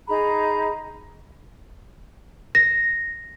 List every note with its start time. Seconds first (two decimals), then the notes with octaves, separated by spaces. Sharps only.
0.07 D#4 G#4 A#5 B5
2.55 A#6